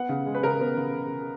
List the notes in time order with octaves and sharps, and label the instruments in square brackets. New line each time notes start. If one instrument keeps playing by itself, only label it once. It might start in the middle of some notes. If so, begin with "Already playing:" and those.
Already playing: [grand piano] B3 F#5
C#3
G#3
B4
C#3 A#4
B3
C#3